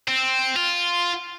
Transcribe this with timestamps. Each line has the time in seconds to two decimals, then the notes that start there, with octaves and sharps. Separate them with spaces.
0.08 C4
0.56 F4